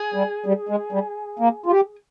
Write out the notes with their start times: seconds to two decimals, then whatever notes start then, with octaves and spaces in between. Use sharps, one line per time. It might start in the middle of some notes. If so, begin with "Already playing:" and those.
Already playing: G#4
0.14 G3
0.46 G3
0.69 G#3
0.92 G3
1.39 A#3
1.66 F4
1.71 G4